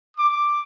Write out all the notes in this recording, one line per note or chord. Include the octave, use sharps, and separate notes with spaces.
D6